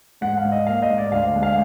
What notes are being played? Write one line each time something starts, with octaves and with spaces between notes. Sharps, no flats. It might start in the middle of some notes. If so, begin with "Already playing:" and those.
G#2 F#5
F5
G#2
D#5
A#3 F5
D#5
G#2
D5
D2 F5
G#3
F5